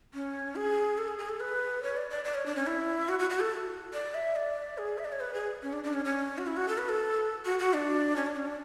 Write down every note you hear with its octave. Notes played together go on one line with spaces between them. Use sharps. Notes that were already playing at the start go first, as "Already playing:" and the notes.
C#4
G#4
A4
G#4
G#4
A4
B4
C#5
D5
D5
D5
C#5
D4
C#4
E4
F#4
F#4
F#4
A4
D5
E5
D5
G#4
E5
D5
C#5
B4
G#4
C#4
D4
D4
C#4
C#4
F#4
E4
F#4
A4
B4
A4
F#4
F#4
D4
C#4
D4
C#4
D4